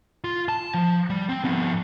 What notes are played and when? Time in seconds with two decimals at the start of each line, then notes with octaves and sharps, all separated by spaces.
0.24 F4
0.49 A5
0.74 F3
1.10 G3
1.29 C4
1.44 F3 B3